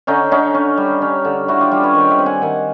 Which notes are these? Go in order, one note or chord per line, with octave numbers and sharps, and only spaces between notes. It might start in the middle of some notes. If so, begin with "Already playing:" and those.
D3 C#4 D#4
D3 C#4 D#4
C#4
G3
C#4
D3
D3 E4 F#4
F4 G4
G3 F4 G4
B4 C#5
D#3
G5
E5 F#5
C4
F#5 G#5
D#3 F#5 G#5